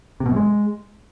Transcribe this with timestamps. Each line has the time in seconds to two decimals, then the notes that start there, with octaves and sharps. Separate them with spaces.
0.20 C3
0.26 B2
0.31 F#2
0.36 G#3